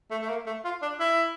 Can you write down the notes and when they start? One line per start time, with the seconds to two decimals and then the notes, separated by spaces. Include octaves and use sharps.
0.11 A3
0.22 A3
0.29 A#3
0.46 A3
0.64 F4
0.82 D4
1.00 E4